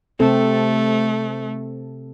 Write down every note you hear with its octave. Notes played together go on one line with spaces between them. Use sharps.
C3 A3 C4 A4